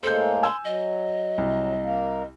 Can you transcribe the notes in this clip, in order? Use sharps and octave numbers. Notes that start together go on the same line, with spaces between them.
A2 G#3 A#3 A4 C5 G6
G#5 C6 E6
F#3 D#5
C2
A#3